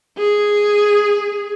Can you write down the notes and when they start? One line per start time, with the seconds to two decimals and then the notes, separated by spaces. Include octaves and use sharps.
0.17 G#4